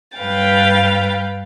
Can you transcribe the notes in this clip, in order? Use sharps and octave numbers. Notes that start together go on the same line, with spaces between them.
G2 B4 F5 G5 A6